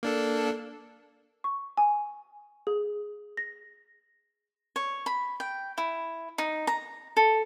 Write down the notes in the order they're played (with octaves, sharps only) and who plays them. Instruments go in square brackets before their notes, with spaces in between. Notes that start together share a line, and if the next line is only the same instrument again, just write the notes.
[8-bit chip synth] A#3 D4 A4
[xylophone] C#6
G#5
G#4
A#6
[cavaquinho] C#5
B5
G5
E4
D#4
A#5
A4